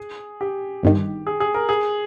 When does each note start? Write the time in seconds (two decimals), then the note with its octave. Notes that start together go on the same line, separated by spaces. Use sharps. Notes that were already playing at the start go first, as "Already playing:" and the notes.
Already playing: G#4
0.41 G4
0.83 G1 G2 D#3
1.27 G#4
1.40 G#4
1.54 A#4
1.69 G#4